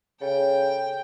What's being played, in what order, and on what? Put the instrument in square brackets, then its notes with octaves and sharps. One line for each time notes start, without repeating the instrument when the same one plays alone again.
[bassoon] C#3 [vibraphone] A4 C#5 [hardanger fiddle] G5